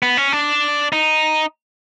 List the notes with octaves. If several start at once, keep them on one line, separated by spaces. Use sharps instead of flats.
B3
C#4
D4
D#4